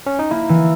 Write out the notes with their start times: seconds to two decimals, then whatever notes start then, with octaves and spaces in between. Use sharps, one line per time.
0.06 C#4
0.19 D#4
0.31 A#3 E4
0.49 E3